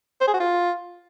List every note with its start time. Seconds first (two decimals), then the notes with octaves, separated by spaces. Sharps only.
0.21 C5
0.27 G#4
0.34 F#4
0.40 F4